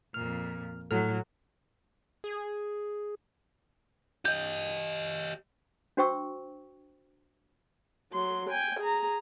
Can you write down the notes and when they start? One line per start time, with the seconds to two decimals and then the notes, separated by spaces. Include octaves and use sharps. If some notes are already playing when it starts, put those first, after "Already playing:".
0.14 F2 A#2 F6
0.91 A2 F#3 A4 F6
2.24 G#4
4.25 G4 D#5 G6
5.97 D4 F#4 C5 G5 C#6 E6
8.12 F#3 C6
8.50 G5 G#5
8.80 G#4 A#5